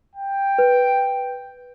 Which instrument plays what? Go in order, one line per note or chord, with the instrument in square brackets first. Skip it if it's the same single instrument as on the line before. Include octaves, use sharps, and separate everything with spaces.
[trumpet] G5
[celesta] B4